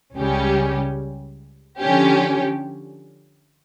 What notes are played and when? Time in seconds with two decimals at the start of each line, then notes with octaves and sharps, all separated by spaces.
0.15 C#2 C#3 G3 C#4 G4
1.80 D3 F3 C#4 G4